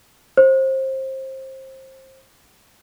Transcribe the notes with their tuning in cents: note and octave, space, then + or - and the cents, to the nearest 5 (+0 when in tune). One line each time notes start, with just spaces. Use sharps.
C5 +25